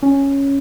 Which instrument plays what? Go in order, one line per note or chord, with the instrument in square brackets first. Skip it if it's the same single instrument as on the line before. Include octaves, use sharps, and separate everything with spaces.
[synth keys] C#4